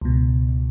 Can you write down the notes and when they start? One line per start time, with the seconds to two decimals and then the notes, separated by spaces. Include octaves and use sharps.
0.01 C#2 B2